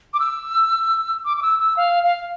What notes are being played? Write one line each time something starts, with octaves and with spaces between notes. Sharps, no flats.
D6
E6
D6
D6
E6
E6
F5
F5